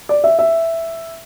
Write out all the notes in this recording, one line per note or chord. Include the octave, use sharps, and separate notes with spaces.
D5
E5
E5